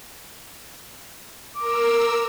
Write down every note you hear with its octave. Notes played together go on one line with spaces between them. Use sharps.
A#4 D6 E6